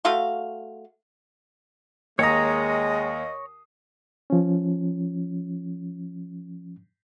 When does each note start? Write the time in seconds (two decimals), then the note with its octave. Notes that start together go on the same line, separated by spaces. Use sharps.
0.05 A3 F#4 F5 C6
2.19 D#2 G#3 C#5 D#5 A#5 D#6
4.30 F3 C#4